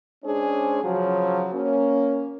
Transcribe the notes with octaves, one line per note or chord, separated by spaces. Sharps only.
G#3 C#4 D4 G#4 C5
C#3 F3 F#3
A#3 C#4